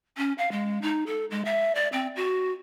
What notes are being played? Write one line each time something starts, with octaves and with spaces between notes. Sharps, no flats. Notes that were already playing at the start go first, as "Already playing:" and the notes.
C#4
F5
G#3
D#4
A4
G#3
E5
D5
C4
F#4